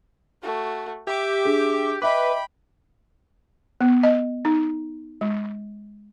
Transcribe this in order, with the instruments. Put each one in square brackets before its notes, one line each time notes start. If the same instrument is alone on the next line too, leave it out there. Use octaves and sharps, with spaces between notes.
[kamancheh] A3 F#4
[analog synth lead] G4 [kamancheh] E5 D6
[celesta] D4 G#4
[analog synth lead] B4 [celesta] D#5 E5 D6 [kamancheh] G5 B5
[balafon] B3
D#5
D#4
G#3